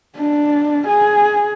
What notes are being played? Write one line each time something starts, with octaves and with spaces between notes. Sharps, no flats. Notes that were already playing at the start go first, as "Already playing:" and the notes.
D4
G#4